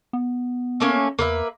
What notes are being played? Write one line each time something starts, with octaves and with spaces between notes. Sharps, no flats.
B3
A3 A#3 C#4
E2 A#3 B4 E5